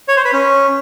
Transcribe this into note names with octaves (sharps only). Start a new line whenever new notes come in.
C#5
C5
B4
C#4